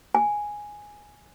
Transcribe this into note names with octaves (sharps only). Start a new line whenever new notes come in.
G#5